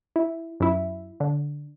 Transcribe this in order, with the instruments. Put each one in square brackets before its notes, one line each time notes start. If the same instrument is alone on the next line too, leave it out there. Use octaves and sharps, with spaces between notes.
[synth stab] E4
F#2 E4
D3